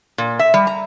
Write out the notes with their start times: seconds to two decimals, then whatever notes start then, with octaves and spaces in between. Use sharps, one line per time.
0.18 A#2
0.39 E5
0.54 G3
0.67 A#5